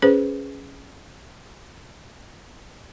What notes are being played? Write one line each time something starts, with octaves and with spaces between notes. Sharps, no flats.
C#4 G#4 B4 C5